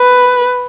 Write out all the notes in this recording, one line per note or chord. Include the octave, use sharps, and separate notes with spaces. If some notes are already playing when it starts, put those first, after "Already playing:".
Already playing: B4